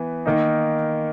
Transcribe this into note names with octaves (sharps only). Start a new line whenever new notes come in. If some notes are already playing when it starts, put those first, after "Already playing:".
Already playing: E3 B3
D#3 A#3 D#4